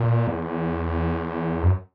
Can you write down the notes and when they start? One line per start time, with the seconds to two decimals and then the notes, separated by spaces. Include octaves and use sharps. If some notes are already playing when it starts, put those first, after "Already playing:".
Already playing: A#2
0.27 E2
1.62 F#2